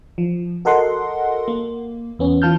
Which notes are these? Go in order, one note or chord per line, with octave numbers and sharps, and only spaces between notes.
F3
F#4 A4 A#4 D#5 F#5 C6
A#3
E2 B3 C#4
E3 F4 A5 F6 G6